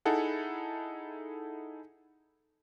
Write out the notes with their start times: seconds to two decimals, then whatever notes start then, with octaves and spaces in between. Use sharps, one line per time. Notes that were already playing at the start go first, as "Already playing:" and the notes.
0.05 D#4 E4 G#4 A4 F#5